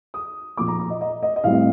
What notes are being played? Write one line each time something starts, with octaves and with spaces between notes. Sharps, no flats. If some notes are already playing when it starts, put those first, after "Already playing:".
D#6
A#2 F3 A#3 D6
A#5
A#5
D#5
D#5
D#5
D#5
A2 G3 C4 F5